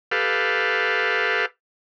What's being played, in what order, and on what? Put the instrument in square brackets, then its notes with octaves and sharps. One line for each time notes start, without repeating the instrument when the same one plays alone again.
[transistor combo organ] G4 A4 B4 F5